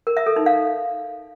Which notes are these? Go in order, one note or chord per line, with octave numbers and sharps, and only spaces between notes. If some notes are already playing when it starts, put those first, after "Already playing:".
A#4
E5
A4
D#4
F5